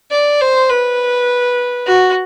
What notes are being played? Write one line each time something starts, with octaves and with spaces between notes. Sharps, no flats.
D5
C5
B4
F#4